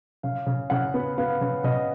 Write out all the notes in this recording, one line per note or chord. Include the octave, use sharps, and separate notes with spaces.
C#3 F5
C#3
C#3 F#5
B3
B3 F5
C#3
C#3 D#5